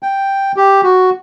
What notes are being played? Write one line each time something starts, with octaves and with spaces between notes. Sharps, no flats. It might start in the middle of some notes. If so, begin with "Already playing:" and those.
G5
G4
F#4